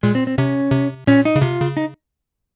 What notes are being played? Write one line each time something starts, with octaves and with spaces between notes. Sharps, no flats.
A#2 G#3
C4
C4
C3 C#4
C3
A#2 C#4
D#4
C#3
C3 F4
C#3
D#4